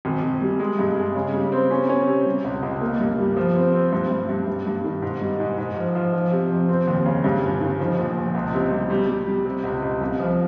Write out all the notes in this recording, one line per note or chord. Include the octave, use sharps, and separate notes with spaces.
G#1
G#1
G3
G#3
G2
G#3
C#3
G3
C4
C#4
C#4
C3
G3
C#2
C#2
A#3
G2
G3
F3
C4
C4
G2
G2
G2
G2
G2
D#3
G#2
G3
G#2
G#2
F3
F3
F3
C3
F2
C4
D#2
C#3
G2
G1
D#3
F3
A#1
A#1
C#2
C3
G3
G3
G3
G3
C3
C#2
C#2
C2
F3